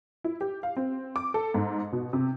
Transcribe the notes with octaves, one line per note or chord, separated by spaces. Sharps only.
E4
G4
F5
C4
D6
A4
G#2
B2
C3